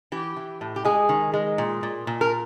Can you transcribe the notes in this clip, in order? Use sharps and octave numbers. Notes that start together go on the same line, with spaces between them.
E3 G4
E3
A2
G4
G#3 G#4
D#3
G#3
A#2
A#2
A#2
A#4